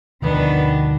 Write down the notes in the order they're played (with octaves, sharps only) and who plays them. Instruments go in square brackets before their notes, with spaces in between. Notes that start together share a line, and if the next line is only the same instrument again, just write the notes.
[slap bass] D2 B2 F3 [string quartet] D#3 B3 D4